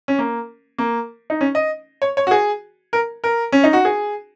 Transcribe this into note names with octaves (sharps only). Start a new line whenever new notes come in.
C#4
A#3
A#3
D#4
C#4
D#5
C#5
C#5
F#4
G#4
A#4
A#4
C#4
D#4
F#4
G#4